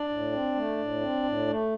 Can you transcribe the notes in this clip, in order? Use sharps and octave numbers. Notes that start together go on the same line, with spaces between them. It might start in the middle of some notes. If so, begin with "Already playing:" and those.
Already playing: D4 D5
A2
C4
A3
A2
C4
A2
A3